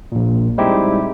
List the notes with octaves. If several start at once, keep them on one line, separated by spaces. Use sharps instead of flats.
A#1 A#2
G3 G#3 C4 D#4 E4 G4